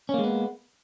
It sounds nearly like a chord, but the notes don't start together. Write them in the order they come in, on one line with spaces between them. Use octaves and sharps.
C#4 A#3 G#3 B3